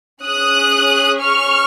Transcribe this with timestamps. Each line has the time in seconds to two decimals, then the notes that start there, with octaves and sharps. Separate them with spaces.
0.24 C#4 G#4 D#6 F#6
1.21 C#6 F6